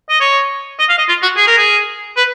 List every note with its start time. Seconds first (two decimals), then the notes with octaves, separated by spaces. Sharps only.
0.10 D#5
0.21 C#5
0.79 D#5
0.89 F5
0.98 D#5
1.08 F4
1.23 F#4
1.37 G#4
1.47 A#4
1.58 G#4
2.17 B4